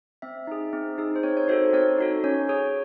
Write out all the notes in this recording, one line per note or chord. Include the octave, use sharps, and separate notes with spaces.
C4 E5
D#4 G#4
C4
D#4 G#4
C5
C4 C#5
C#5
D#4 F#4 A4 C5
C4 C#5
D#4 F#4 A4
C#4 C#5
G#4 C#5